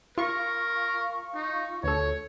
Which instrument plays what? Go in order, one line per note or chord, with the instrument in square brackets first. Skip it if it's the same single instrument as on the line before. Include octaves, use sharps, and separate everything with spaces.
[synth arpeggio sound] F4 C#6 [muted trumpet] A#4
[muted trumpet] D#4
[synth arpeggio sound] D2 A4 [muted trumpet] C#5